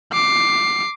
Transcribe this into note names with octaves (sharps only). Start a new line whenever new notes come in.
D6 C7